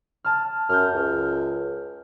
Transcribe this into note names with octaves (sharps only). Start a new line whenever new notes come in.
A5 F6
F#2 F6 G6
C#2